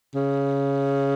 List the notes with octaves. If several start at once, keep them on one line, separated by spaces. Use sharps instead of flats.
C#3